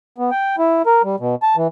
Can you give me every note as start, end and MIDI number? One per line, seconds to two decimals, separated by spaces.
0.18 0.30 59
0.31 0.56 79
0.58 0.82 64
0.86 1.02 70
1.04 1.16 55
1.20 1.35 47
1.43 1.56 81
1.56 1.67 52